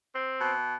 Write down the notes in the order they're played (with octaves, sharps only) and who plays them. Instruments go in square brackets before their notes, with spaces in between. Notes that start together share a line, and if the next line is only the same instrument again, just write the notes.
[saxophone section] C4
B2